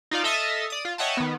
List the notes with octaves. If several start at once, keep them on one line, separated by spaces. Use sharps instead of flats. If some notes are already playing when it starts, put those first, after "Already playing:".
D#4 F4 D5 F5
A4 D#5 E5 D#6 F6 A6
D5 D#6
F4
C#5 D#5 E5 F#5 G5 A5
D#3 B3